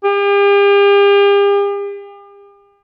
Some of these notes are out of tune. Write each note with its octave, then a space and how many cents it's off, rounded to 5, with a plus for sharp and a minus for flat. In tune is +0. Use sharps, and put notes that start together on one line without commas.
G4 +45